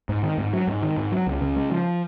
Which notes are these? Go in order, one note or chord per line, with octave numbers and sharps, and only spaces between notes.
G#2
D#3
G#2
F#3
G#2
D#3
G#2
F#3
C#2
C#3
G#3
F3